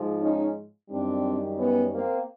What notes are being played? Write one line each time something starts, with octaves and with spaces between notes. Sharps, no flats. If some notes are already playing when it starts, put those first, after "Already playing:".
Already playing: G#2 F3 G#3
C#4 D#4
F#2 D#3 G3 C4 D4
B3 C#4
A#3 C4